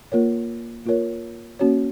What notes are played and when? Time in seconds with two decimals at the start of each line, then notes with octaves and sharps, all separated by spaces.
0.12 A#3 F4 A#4 C#5
0.85 A#3 F4 A#4 C#5
1.59 A#3 C#4 F#4 C#5